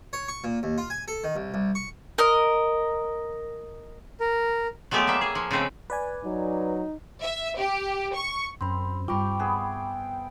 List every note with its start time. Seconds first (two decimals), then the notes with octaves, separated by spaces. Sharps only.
0.13 C#5
0.28 C#6
0.44 A#2
0.63 D#2
0.78 F4
0.90 G#5
1.08 A4
1.24 D#3
1.36 C2
1.54 C2
1.75 C#6
2.18 A#4 D#5
4.20 A#4
4.91 F#3 G#3 A3 B3 G4
5.07 G3 A#3 E5
5.21 G#4
5.35 F3
5.51 C#3 G#3 A3 C4 B4
5.90 B4 D5 G#5
6.24 F#3 D#4
7.22 E5
7.58 G4
8.14 C#6
8.61 F#2 C4 B5 C6
9.08 G2 G3 F4 G5 B5 C#6 D6
9.39 B3 G#4 E5